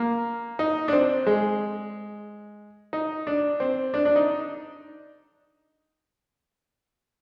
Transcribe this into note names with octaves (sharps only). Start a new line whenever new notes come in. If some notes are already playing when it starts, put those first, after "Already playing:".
Already playing: A#3
D#4
D4
C4
G#3
D#4
D4
C4
D4
D4
D#4